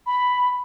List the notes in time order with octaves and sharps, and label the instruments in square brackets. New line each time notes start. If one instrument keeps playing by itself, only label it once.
[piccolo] B5